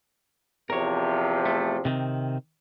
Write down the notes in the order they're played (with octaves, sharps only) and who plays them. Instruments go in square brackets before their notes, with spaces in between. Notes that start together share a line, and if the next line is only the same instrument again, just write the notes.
[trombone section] E2 C3 F3 [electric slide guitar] A#4 C#5
[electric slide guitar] A3
C3 D#3 C4